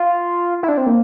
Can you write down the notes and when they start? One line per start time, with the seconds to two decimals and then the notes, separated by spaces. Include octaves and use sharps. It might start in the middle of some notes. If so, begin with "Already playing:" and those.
Already playing: F4
0.63 E4
0.69 D4
0.78 C4
0.87 A#3